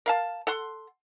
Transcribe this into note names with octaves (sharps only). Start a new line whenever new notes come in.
A#4 F5 A5
A4 F#5 C6